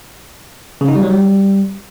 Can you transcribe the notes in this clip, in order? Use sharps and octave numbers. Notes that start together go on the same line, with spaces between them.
C#3
D#4
G3
F#3
G3